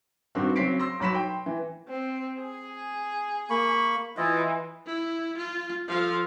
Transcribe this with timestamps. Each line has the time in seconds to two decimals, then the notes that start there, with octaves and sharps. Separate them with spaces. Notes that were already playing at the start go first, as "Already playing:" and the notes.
0.35 G2 D#3 C4 F#4
0.56 C#3 F#3 C4 B6 C7 D7
0.80 C6 E6 A#6
1.00 B1 F#3 B5 B6 E7
1.15 G5 C6
1.46 E3
1.88 C4
2.39 G#4
3.50 A#3 B5 C#6
4.17 E3 E4 F4 D#5
4.86 E4
5.37 F4
5.89 F3 A4 F5